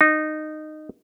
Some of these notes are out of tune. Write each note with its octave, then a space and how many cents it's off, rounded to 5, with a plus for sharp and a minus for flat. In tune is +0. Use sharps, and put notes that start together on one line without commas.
D#4 -15